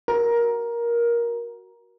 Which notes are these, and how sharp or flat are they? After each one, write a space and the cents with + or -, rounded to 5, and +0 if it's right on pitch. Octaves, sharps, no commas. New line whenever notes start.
F#4 +0 A#4 +15